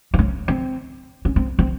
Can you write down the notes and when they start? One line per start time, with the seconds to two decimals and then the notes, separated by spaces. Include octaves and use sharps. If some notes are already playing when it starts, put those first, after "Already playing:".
0.14 C4
0.19 C#4
0.48 C4
1.25 C#4
1.36 C4
1.59 C4